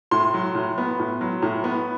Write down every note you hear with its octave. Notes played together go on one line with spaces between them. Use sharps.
A2 C6
F#3
A2
B3
A2
F#3
A2
B3